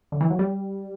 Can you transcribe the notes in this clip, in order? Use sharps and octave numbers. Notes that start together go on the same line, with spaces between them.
D3
E3
F#3
G3